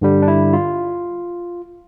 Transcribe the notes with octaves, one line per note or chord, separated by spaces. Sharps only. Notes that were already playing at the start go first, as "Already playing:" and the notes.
G2 D3 G3
D4
E4
F4